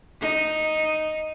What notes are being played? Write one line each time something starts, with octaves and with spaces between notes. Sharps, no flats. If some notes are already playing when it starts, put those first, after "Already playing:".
D#4